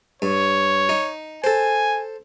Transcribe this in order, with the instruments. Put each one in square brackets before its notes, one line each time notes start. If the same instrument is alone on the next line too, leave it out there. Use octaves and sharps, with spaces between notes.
[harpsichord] G2 [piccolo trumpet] C#5
[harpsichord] D#4
[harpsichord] A4 C5 [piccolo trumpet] G#5